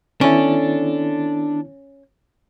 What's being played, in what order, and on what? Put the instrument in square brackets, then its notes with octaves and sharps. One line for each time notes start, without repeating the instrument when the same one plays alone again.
[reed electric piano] D#3 B3 E4 [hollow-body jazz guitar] C#4 [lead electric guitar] D4 A4